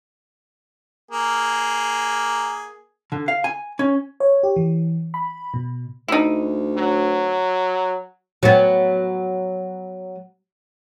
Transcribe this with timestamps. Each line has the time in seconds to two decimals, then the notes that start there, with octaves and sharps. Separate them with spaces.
1.11 A#3 G#4
3.12 D3
3.28 F5
3.44 G#5
3.79 C#4
4.20 C#5
4.43 G4
4.56 E3
5.14 B5
5.54 B2
6.08 D2 D#4 E4
6.77 F#3
8.43 F#3 B3